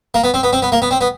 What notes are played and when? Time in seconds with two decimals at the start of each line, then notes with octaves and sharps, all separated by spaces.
0.14 A#3
0.24 B3
0.34 C4
0.43 B3
0.53 C4
0.62 B3
0.72 A#3
0.82 B3
0.91 C4
1.01 B3